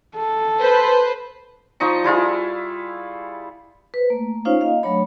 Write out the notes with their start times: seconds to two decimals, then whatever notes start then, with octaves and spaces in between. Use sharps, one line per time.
0.17 A4
0.60 B4 C5
1.80 F3 D#4 D#5 C#6
2.04 G3 E4 F4 G#4
3.94 B4 C5
4.10 A3 A#3
4.45 C#4 D#4 F4 C5 C#5 F5
4.61 A#3 D#5 F5
4.83 F#3 A3 D4 C#5 B5